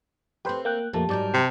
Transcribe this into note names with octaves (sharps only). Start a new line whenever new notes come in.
A3 C4 G4 B4 C5
A#3 G5 F#6
F2 A#2 A3 A#3 G4 A5
G#2 F#3 G3 A#4 D5 G6
C3